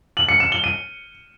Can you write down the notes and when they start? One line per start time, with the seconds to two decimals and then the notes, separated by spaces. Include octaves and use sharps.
0.17 F#7
0.29 C#7
0.40 E7
0.52 G7
0.64 D#7